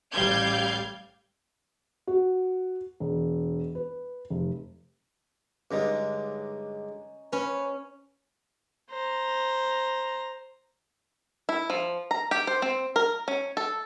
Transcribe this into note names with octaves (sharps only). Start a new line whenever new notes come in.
A1 G3 F5 G6 G#6
F#4
E1
B4
F1
G2 D3 G#3 C#4 D#4
C#4 B4
C5 A#5
E4
F3
A#5
G4
C5
C4
A#4
C#4
A4